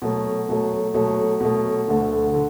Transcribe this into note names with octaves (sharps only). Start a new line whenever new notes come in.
B2 F#3 A3
B2 F#3 A3
B2 F#3 A3
B2 F#3 A3
D2 D3 A3
D3